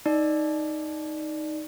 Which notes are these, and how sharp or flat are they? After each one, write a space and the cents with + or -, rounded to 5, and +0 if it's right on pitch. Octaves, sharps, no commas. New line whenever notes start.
D#4 +0 D5 +0